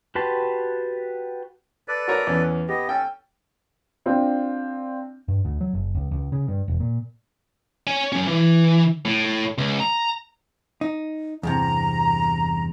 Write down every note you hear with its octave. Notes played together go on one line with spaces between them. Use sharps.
F#4 G4 B4 A5 C6
A4 B4 D5
F#4 A#4 C#5
E2 C#4
B3 G4 D#5
C#4 A4 G5
C4 D4 F4
G2
D2
F#3
F#1
C#2
C#2
C#3
G2
E1
A#2
C#5 G#5
F#3 C#4
E3
A2
C#2
A#5
D#4
E2 G2 C3 A#5